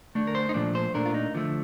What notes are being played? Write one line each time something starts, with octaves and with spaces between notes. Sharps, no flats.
D3 A3 D4
A#4
C5
D#4
A#2 F3 A3 D4
C5
A#2 A3 D4 A#4
F4
D#4
D3 F3 A3